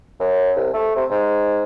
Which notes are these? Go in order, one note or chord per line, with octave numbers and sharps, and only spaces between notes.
F#2
C2
A3
C3
G#2